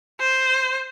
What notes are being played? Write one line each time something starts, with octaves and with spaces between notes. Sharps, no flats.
C5